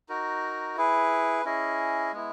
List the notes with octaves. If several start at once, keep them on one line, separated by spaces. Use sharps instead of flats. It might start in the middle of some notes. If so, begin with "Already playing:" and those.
D#4 F#4 A#4
E4 G#4 B4
C#4 E4 G#4 D#5
G#3 B3 E4